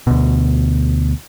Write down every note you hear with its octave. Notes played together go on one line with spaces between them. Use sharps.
D2 B2